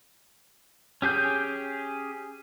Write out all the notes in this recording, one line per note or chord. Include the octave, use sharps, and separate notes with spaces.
C#4 G4 G#4 G6